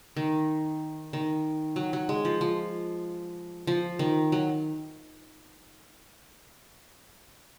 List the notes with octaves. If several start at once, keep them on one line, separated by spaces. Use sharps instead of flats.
D#3
D#3
F#3
F#3
G#3
F3
F3
F3
D#3
F#3